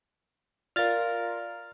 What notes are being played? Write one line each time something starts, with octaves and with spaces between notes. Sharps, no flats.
F4 A#4 D5 F5 F6 A6